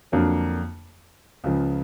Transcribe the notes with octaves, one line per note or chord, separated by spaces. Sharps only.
F2 D3 F#3 A#3 D4
C#2 C#3 F3